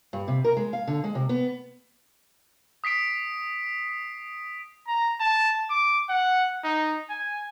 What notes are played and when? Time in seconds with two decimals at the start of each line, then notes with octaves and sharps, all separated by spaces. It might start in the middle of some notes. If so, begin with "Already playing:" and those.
0.13 G2
0.28 C3
0.44 A#4
0.57 G#3
0.73 F5
0.87 D3
1.04 G#3
1.15 C3
1.29 B3
2.84 D#6 B6 C7 D7
4.87 A#5
5.20 A5
5.70 D6
6.09 F#5
6.64 D#4
7.10 G#5